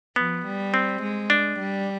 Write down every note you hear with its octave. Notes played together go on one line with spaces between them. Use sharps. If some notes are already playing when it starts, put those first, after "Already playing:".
F3 B3
G3
C4
G#3
D4
G3